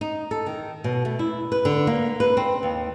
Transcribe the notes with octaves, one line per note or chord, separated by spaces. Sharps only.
D#4
A4
D#3
B2
A3
E4
B4
D3
A#3
B4
C4
D#2